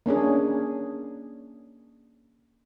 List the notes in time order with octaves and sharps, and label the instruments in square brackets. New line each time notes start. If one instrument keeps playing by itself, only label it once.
[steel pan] A#3 C#4 D4 G#4